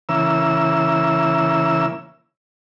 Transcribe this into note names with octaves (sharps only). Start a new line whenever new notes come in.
C#3 E3 A#3 E6